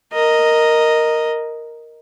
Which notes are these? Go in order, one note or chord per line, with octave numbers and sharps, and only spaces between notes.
A#4 D#5